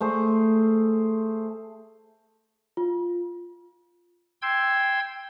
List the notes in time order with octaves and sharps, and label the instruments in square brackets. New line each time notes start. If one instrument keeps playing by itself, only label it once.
[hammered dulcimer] A3 G#4 C5
[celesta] F4
[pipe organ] G5 C6 E6 G#6